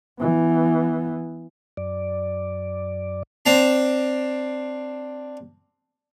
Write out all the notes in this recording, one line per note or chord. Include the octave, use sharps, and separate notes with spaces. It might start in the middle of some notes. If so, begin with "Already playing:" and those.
E3 B3
F#2 D5
C4 D4 A5 A#5